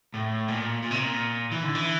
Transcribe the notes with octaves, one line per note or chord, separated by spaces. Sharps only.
A2
A#2
A#2
C3
A#2
E3
D3
E3